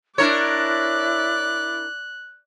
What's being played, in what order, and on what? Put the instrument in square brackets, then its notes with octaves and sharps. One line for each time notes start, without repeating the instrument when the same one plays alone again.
[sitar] D4 A#4 C#5 [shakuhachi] E4 [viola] D5 [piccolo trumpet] F#6